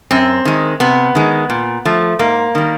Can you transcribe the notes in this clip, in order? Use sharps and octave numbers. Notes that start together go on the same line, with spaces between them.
F#2 C4
D#3 G#3
C3 B3
D#3 G#3
A#2
F3 A3
G#2 A#3
D#3 G3